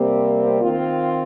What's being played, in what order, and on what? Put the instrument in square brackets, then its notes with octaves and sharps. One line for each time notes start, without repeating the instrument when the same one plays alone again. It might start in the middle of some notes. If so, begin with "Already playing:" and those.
Already playing: [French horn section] C3 G3 C4 G4 [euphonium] A#3
[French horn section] D#3 C4 F4